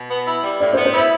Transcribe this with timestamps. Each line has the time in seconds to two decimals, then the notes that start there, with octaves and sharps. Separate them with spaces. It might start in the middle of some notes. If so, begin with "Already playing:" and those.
Already playing: B2
0.10 B3
0.27 E4
0.43 G3
0.60 A2 D5
0.73 C5
0.77 B3
0.85 C5
0.94 E4 E5